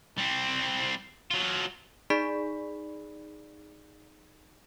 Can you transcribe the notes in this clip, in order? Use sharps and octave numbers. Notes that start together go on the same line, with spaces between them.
G3 C4
F#3 F4
D#4 G#4 D5 B5 B6